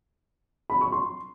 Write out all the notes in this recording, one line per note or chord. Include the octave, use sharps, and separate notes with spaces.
B5
C#6
C6